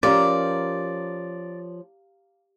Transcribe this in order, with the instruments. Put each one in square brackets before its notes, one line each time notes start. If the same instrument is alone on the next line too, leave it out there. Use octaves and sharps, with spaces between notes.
[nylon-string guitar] F3 C#4 A#4 [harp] G4 F5 A#5 [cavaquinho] D5